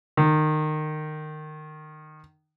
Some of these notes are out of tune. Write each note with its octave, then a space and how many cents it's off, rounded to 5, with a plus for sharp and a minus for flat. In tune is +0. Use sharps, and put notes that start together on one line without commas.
D#3 -20